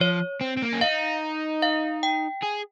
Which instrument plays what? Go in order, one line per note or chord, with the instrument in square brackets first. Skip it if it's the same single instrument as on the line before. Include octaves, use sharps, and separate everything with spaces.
[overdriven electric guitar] F3 [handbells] C#5
[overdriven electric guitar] C4
C4
A#3
C#4
[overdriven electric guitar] D#4 [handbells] F5
[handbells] F5
G5
[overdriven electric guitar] G#4